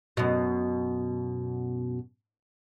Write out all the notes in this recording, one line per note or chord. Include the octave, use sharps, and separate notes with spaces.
F#2 B2